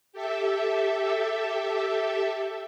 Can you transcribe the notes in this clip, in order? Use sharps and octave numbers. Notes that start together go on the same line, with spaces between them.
G4 A4 E5